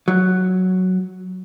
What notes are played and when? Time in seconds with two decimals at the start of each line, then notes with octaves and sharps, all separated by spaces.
0.08 F#3